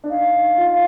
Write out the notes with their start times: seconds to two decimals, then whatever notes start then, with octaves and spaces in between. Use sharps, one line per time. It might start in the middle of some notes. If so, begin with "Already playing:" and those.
0.04 D4
0.09 D#4 F5
0.33 D#4
0.57 F4